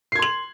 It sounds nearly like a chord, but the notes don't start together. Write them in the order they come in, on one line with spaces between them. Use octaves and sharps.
C7 G#6 C6 F#7